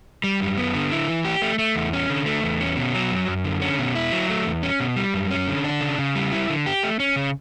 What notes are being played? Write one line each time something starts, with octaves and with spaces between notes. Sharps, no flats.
G3
F#2
B3
D3
E4
E3
G4
A3
A3
E2
C#4
D3
A3
E2
C#4
B2
F#3
F#2
F#2
D3
C#4
B2
E4
F#3
A3
E2
C#4
B2
G3
F#2
C#4
D3
D4
C#3
C#3
G3
E4
D3
G4
A3
C#4
C#3